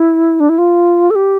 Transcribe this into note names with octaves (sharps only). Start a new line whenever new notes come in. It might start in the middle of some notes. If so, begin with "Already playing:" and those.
Already playing: E4
D4
E4
F4
A4
G4